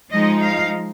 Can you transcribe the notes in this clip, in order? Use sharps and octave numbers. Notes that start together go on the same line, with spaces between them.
F3 G#3 D#4 D#5
F5